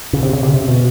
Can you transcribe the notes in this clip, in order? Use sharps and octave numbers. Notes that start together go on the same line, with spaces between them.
C#3
C3
C#3
C3
C#3
C3
B2